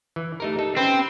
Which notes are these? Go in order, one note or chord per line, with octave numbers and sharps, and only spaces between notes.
E3
A3 D#4 G4 A#4
D#4 A4
C4 C#4 B4 C5 G5